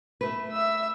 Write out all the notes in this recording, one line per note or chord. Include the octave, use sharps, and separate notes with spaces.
A3 B4
E5 E6